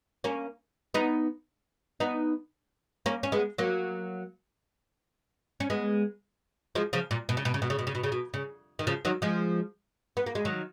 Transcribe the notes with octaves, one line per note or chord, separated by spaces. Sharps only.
A#3 C#4
B3 D#4
B3 D#4
A#3 C#4
C#4
G#3 B3
F#3 A#3
C#4
G#3 B3
F3 G#3
C#3 F3
A#2
B2
C#3
B2
C#3
B2
C#3
B2
C#3
B2
C#3
B2
C#3
D#3
C#3 F3
D#3 F#3
F3 G#3
B3
A#3
G#3
D#3 F#3